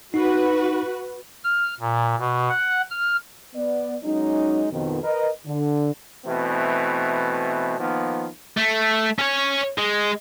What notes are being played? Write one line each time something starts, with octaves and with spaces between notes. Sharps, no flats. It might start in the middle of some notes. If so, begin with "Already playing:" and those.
D#4 F#4 B4
F6
A#2
B2
F#5
F6
B3 D5
F#3 G#3 C#4 D#4
F2 B2 D#3
A#4 B4 D#5
D3
B2 E3 A3 C4
D#3 F3 A#3 B3
A3
C#4 C#5
G#3